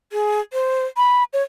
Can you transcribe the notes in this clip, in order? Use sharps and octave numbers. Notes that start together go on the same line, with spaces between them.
G#4
C5
B5
C#5